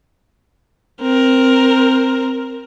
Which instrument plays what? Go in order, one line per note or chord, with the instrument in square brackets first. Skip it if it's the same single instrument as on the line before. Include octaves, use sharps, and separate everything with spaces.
[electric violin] C4 A#4